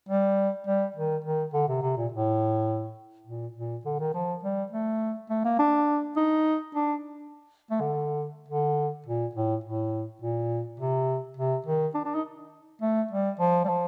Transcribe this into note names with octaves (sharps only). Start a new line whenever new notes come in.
G3
G3
D#3
D#3
D3
C3
C3
A#2
A2
A#2
A#2
D3
D#3
F3
G3
A3
A3
A#3
D4
D#4
D4
A3
D3
D3
A#2
A2
A2
A#2
C3
C3
D#3
D4
D4
D#4
A3
G3
F3
G3
F3